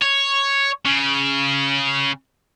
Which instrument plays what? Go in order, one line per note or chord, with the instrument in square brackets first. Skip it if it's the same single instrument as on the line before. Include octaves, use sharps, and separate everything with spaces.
[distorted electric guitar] C#5
C#3